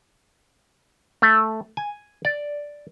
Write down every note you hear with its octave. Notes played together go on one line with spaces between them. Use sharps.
A3
G#5
D5